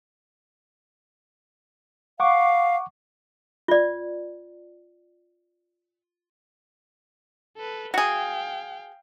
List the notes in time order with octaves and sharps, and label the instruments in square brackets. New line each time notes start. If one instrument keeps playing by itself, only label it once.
[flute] F5 [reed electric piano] F#5 C#6 D6
[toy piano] F4 D5
[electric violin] A4 B4
[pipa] F#4 G#4 [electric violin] F5 G5